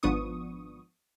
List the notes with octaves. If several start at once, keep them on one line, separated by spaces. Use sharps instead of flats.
G#1 F3 B3 D4 C#6 D#6